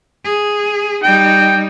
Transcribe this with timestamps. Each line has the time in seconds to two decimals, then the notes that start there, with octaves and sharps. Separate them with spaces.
0.24 G#4
1.04 G3 D#4 G5